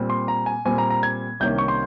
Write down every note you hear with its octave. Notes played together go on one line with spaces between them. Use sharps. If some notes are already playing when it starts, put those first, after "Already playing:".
Already playing: A#2 G3 C4
C6
A#5
G#5
A#2 G3 C4 G#5
A#5
A#5
G#6
C2 C3 D#3 A#3 C#4 G6
C#6
C6